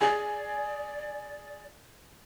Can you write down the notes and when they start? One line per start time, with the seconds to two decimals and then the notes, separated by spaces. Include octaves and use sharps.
0.01 G#4 D5 G#5